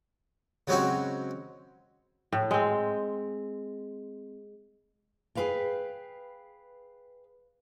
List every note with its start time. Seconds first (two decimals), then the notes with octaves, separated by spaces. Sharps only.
0.67 C#3 F#3 G#3 C4 C#4 F#4
2.32 A2
2.51 G#3 C4
5.35 G#4 A#4 B4 F5 G5